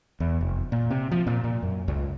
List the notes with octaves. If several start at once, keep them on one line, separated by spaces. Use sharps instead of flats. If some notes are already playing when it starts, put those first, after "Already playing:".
E2
F1
A#2
C3
F3
A#2
A#2
F#2
C#2